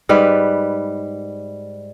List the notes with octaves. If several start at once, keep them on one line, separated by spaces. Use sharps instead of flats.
G#2 G3 B4